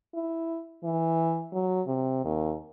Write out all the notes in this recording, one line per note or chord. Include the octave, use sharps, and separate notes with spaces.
E4
E3
F#3
C3
D#2